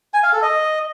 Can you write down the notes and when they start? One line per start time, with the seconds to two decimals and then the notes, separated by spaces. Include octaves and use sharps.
0.14 G#5
0.23 F5
0.33 A4
0.42 D#5